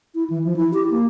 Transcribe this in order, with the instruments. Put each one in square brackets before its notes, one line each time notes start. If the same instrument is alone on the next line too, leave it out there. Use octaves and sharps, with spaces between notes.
[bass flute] E4
E3
F3
E4
G4
A#3